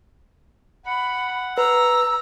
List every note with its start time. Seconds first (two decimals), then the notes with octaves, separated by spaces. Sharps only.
0.86 F#5 B5
1.58 B4 A#5 E6